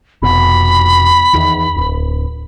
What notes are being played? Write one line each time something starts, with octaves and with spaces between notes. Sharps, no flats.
F1 B2 B5
E2 D#3
D1